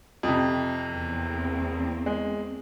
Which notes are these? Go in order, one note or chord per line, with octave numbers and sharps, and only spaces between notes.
F2 C3
E2 A#3 C4
G#3